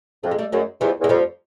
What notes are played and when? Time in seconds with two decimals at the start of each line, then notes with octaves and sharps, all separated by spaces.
0.23 F2 A3
0.31 G#3
0.38 G3 A3
0.52 F#2 F#3 G#3
0.81 E2 F3 G3
1.00 E2 G#3
1.09 F2 F3 G3